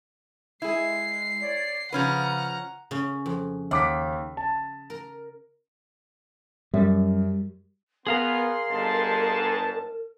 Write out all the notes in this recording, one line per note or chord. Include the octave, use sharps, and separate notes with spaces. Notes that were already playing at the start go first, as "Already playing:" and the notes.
G#3 E4 G#4 C7
C#5 D5
C#3 F3 C#4 B4 F#5 A#5
C#3 C#4
F2
D#2 F#5 D6 B6
A5
A#4
F#2 G3
B3 G#4 A#4 F5 A#5 C6
G1 G#2 A5